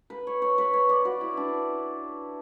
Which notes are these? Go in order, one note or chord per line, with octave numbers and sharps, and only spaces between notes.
B4
C#5
C#5
B4
C#5
D5
F#4
E4
D4